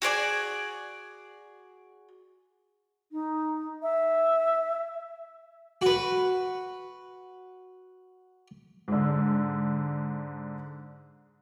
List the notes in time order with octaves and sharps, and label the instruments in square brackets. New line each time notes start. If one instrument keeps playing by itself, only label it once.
[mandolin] F#4 G#4 D5 G#5
[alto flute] D#4
E5
[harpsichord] F#4 B4
[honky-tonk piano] G#2 D3